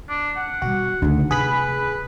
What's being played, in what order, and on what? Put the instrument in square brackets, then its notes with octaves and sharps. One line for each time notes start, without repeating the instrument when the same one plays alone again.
[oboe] D4
F#5
[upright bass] B2 G3 [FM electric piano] F#4
[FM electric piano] D2 [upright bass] C#3 D#4
[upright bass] C3 [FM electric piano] G#4 B5 [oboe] B4